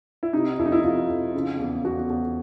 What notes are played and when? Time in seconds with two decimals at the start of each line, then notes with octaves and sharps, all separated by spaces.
0.23 E4
0.33 C3 D#4
0.59 F2 E4
0.66 D#4
0.72 E4
0.83 F2 F4
1.08 F2
1.34 C#3
1.59 E2
1.84 E2 F#4
2.10 E2